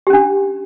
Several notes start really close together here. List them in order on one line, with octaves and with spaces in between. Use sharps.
G4 C#4 D4